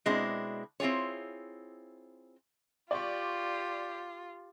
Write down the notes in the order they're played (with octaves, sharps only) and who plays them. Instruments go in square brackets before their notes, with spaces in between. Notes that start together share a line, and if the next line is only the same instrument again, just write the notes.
[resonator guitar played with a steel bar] B2 G#3 C4 D4 E4
C4 E4 F4 G#4 C#5
[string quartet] F4 [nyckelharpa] G4 [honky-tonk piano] D5 C6 C#6